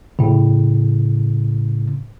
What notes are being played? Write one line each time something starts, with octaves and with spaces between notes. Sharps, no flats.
A2 C#3